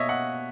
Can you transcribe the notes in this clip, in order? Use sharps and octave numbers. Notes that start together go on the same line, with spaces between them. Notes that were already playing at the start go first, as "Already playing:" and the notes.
Already playing: B2 A#3 C#5 D#5 E5
F#5